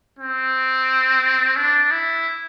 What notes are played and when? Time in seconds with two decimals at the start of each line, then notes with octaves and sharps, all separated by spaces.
0.19 C4
1.57 D4
1.91 E4